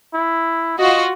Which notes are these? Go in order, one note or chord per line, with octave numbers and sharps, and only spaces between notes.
E4
F4 F#4 D#5